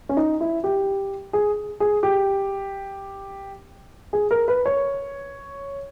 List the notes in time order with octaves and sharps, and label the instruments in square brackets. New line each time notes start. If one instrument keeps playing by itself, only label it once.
[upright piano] C#4
D#4
E4
G4
G#4
G#4
G4
G#4
A#4
B4
C#5